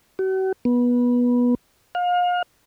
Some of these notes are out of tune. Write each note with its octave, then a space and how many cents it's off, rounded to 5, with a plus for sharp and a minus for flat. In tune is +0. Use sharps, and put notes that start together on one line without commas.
F#4 +45
B3 -20
F5 +35